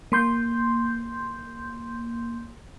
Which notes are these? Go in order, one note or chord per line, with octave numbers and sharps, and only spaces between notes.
A#3 C6 G6